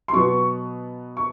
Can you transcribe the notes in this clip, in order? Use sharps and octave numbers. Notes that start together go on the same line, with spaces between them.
C6
B2 F#3 B3 C#6
C#6